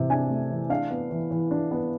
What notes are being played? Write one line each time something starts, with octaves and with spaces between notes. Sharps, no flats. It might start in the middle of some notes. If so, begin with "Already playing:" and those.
Already playing: C3 E3
D4 G#5
A3
E3
D4 F5
B3
E3
E3
D4
B3